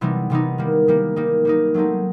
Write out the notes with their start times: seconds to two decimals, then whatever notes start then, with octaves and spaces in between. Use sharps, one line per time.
0.01 C3 E3 G3 B3 D#4
0.30 C3 E3 G3 B3 D#4
0.58 D#3 G3 A#3
0.87 D#3 G3 A#3
1.16 G3 A#3 D#4
1.45 G3 A#3 D#4
1.74 F#3 A3 C4 D#4